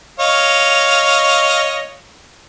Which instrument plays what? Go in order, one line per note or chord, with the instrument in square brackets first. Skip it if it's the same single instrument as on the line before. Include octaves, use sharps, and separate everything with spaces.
[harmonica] C#5 D#5 F5